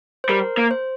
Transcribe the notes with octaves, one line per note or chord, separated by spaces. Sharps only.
C5
G3 A#4
A#3
C5